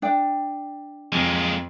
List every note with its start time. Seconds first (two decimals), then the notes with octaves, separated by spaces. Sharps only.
0.02 D4 D5 G5
1.12 F2 G#3 A#3